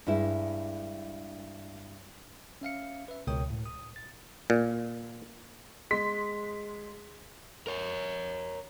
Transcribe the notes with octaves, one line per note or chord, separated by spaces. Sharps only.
G2 G#3 E4
C#4 E5 F5 C#7
B4 E5
C#2 B2 A#4 C#5 G5 D#6
A2
D#6
A6
A#2
G#3 C6 B6
A#4 C#5